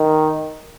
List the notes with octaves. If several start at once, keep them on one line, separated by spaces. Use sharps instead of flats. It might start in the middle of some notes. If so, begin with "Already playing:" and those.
Already playing: D#3